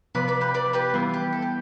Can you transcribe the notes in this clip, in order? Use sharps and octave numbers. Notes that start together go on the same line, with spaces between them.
C3 F3 B3 B4 D5
B4 D5
G4 B4
B4 D5
G4 B4
E3 G3 B3 E4 F4
G4
A4
G4